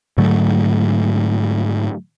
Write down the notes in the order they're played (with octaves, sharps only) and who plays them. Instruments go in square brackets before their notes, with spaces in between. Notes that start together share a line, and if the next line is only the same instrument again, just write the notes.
[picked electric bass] G#2 D3 F#3 A3